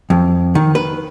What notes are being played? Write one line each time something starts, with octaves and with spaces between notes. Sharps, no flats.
F2
D#3
B4